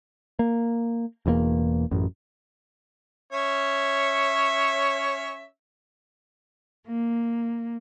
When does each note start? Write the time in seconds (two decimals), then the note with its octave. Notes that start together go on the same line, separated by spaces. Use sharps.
0.39 A#3
1.26 E1 E2 D#3 A#3
1.91 A1 F#2
3.33 C#4 C#5 E5
6.86 A#3